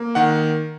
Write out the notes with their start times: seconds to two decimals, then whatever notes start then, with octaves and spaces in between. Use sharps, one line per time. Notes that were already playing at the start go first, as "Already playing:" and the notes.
Already playing: A#3
0.15 D#3 F#5